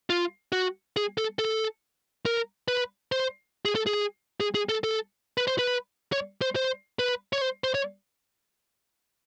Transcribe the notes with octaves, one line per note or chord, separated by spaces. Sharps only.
F4
F#4
G#4
A4
A4
A#4
B4
C5
G#4
A4
G#4
G#4
G#4
A4
A4
B4
C5
B4
C#5
C5
C5
B4
C#5
C5
C5
C#5